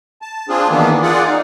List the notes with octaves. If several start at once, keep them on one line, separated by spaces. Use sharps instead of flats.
A5
C4 D4 F4 G#4
D#3 E3 A#3 B3 D4
F4 G#4 D5 F#5
D#4